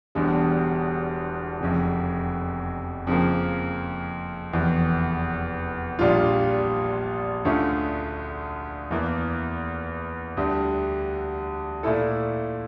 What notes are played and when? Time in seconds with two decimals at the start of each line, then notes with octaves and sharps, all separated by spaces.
0.15 E1 E2 D3 G3
1.61 F1 F2 C#3
3.07 F2 C#3 F3 A#3
4.53 F1 E2 E3
5.99 A#1 A#2 G3 D4 F4
7.45 D2 D3 A3 C#4 F4
8.91 E2 E3 A#3
10.37 D2 D3 G3
11.83 A#2 A3 E4 A4